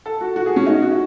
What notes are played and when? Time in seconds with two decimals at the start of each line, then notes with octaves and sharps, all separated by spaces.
0.06 A4
0.21 F#4
0.36 F#4
0.46 G#4
0.56 C#4
0.67 D#4
0.82 F#4